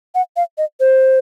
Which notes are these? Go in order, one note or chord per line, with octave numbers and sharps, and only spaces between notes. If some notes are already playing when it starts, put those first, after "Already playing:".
F#5
F5
D#5
C5